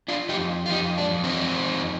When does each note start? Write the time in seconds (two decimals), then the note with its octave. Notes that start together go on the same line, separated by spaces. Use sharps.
0.08 D4 F4
0.29 F2 D#4 G4
0.66 F4
0.70 F2 D#4 G4
0.98 D4
1.10 F2
1.24 C4 D#4
1.51 F2